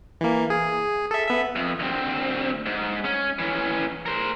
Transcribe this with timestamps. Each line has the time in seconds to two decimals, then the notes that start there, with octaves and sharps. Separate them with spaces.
0.21 E3 A#3
0.50 G#4
1.11 A4 E5
1.27 B3 E5
1.56 F2
1.80 D2 C4
2.66 G#2
3.05 C#4
3.39 E3 C#4
4.06 A#4 C5